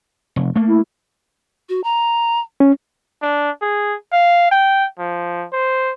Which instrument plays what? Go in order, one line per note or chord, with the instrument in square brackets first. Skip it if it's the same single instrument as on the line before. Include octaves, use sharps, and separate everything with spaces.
[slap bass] F1
A3 A#3
[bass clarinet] E4
[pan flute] F#4
A#5
[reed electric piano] C#4
[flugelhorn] D4
G#4
F5
G5
F3
C5